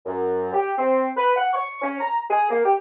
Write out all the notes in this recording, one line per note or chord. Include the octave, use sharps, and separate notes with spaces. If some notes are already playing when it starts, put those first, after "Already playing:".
F#2
G4
C4
B4
F#5
C#6
C#4
A#5
G#4
A#3
G4